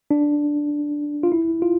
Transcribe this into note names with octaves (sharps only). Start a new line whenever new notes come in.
D4
F4
E4
F4